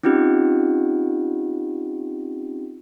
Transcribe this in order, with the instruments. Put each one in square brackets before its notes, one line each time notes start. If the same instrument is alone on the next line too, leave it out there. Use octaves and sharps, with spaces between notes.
[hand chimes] C4 C#4 D#4 F4 G4